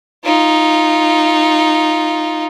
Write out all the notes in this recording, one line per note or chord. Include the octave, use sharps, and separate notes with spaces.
D#4 F4